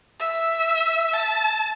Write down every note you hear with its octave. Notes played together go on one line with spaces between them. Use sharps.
E5
A5